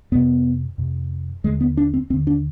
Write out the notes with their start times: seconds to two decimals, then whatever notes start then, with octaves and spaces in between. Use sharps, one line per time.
0.12 F2 C3 B3
0.78 F2 C3
1.44 D#2 D3 G#3
1.61 B3
1.77 D4
1.94 C4
2.10 D#2 C4
2.13 D3
2.27 D4